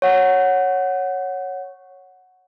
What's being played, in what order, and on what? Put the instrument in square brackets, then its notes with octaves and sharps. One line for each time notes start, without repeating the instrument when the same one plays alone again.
[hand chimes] C#5 F#5